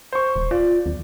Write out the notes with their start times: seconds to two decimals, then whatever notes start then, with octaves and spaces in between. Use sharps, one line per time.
0.13 C5 C#6
0.36 D#1
0.51 F4 D5
0.86 D#2